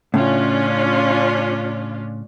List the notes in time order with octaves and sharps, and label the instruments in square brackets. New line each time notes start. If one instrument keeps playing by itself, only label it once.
[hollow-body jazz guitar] A2 C#3 [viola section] C#4 D4 F4